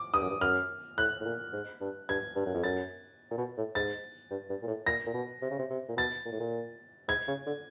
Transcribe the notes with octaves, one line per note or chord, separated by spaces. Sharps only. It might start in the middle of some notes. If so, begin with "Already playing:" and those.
Already playing: D6
G2 D#6
F#2
G2
F#2 F6
A2 F#6
A2
A#2
G#2
G2
G2 G#6
G2
F#2
F2
F#2 A6
A#2
B2
A2
G#2 A6
G2
G2
A#2
A2
A#2 A#6
A#2
B2
C3
C#3
C3
C3
A#2
B2 A6
A#2
A2
A#2
G#2 G#6
C#3
D3